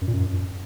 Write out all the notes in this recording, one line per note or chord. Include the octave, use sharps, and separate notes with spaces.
F#2
A#2
F#2